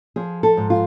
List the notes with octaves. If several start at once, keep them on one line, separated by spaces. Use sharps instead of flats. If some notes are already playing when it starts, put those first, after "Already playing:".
F3 G#4
A4
G#2
F4